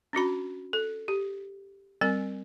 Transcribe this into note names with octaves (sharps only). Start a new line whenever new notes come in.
C#4 D4 F#4 B5
A4
G4
G3 C4 A#4 G#5